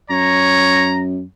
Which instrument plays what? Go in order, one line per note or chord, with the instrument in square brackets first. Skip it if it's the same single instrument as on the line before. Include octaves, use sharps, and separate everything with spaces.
[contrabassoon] F#2 [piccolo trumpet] C#5 [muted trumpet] A#5